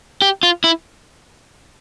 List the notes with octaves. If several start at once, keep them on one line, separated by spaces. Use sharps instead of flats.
G4
F4
E4